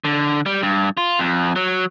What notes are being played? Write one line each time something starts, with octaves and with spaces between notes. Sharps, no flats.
D3
G3
G2
F4
F2
F#3